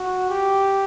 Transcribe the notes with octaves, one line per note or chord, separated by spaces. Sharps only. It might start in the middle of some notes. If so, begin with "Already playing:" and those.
Already playing: F#4
G4